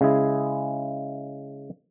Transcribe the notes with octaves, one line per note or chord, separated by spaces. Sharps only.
C#3 G#3 E4 G#4